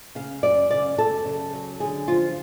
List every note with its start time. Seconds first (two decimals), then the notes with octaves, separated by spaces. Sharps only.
0.15 C#3 F5
0.43 F#2 D5
0.70 C#3 D5
0.98 F#2 A4
1.25 C#3
1.53 F#3
1.80 D3 G#4
2.07 F3 F4